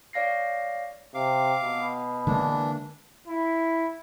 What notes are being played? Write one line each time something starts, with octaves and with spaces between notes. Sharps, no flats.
C#5 D5 F5 A#6 C7
C3 F5 D6
B2
D3 E3 G#3 A#3 D4
E4